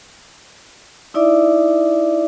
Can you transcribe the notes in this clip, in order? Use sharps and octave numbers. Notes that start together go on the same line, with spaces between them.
D#4 E4 D5 E5 D6